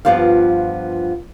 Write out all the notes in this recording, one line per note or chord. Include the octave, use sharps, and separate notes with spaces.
G2 F3 B3 F4 G4 F5